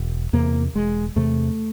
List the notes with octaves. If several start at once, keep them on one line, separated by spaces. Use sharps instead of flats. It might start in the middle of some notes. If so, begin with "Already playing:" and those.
Already playing: E1
E2 C3 A#3
E1 G#3
E2 C3 A3